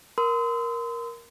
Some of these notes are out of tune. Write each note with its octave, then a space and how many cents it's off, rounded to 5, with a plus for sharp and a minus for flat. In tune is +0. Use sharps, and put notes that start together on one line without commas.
A#4 +10 C6 -35 D#6 +45